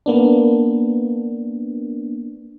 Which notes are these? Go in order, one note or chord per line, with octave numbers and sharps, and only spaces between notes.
A#3 B3 D4